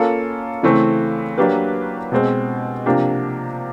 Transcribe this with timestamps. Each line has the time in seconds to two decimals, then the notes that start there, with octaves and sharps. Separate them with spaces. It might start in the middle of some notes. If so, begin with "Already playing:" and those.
Already playing: A#3 C#4 F4 A4
0.63 C#3 E3 A3 C4
1.38 F#3 A#3 D4 G4 B4
2.12 B2 G#3 C4
2.86 C3 F3 A#3 D4 G4